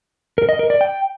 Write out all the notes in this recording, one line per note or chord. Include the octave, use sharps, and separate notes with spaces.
A#4
D#5
A#4
D5
G5